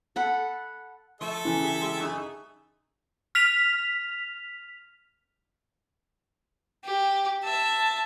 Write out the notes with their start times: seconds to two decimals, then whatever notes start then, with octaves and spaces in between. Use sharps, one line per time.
0.16 A4 F#5 B5
1.21 F3 A3 A4 E5
1.45 C#3 E3
1.62 G4 G#4
1.81 G#3 G4
2.00 F#2 D#4 G#4
3.35 F6 B6 F7
6.85 G4
7.44 E5 A5